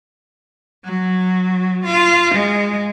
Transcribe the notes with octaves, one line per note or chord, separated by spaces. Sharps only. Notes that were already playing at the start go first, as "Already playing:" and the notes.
F#3
F4
G#3